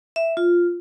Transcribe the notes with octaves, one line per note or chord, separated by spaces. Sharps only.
E5
F4